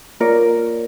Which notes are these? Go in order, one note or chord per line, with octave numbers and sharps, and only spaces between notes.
A#3 F4 A#4 C#5 D5